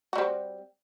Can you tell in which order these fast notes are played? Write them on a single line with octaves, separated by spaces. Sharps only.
F#4 G3 C4